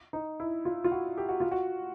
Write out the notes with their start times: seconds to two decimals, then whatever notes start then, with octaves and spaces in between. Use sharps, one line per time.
0.13 D#4
0.40 E4
0.65 F4
0.84 F4
0.92 F#4
1.18 G4
1.29 F#4
1.40 F4
1.51 F#4